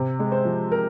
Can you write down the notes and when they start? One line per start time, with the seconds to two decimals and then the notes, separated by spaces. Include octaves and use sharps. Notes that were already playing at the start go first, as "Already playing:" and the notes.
Already playing: C3
0.19 G#3
0.32 C5
0.45 F3
0.72 A#4